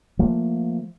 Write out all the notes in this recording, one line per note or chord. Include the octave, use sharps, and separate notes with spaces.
F3 A3 A#3